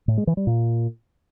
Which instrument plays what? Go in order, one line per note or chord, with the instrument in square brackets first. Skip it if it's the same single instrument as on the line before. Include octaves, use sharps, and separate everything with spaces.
[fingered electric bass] A2
G#3
E3
G3
A#2